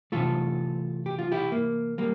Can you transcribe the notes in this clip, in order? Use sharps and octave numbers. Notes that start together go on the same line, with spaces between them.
C3 E3 A3 F4 A4
G4
F4
E4 G4
A#3
G3 A#3